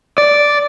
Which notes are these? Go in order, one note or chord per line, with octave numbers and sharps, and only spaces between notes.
D5